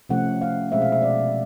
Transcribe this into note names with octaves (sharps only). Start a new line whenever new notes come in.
C3 F3 A3 C#4 F#5
F5
B2 G#3 C4 E5
F5
E5
D5